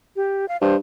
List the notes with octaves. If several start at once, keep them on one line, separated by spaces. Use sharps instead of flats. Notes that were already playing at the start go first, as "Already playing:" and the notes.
G4
F5
G2 C5